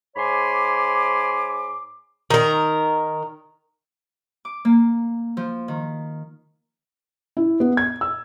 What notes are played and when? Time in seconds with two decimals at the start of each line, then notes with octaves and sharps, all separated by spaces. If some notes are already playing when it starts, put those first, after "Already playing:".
0.15 G#2 C#5 G#5 B5 C6 D6
2.30 D#3 A#4
4.45 D6
4.65 A#3
5.37 F3
5.68 D#3
7.37 E4
7.60 B3
7.77 G#6
8.01 E6